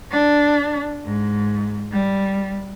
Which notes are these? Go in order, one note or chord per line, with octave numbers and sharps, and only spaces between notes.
D4
G#2
G3